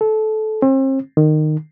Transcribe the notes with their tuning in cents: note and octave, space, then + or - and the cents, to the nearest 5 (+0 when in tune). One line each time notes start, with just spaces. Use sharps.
A4 -20
C4 +40
D#3 -20